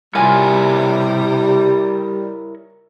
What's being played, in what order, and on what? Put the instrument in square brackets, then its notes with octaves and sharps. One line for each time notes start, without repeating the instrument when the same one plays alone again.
[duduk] C3 [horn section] G3 [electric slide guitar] E4 A#4 C#5 [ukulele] F4 G#5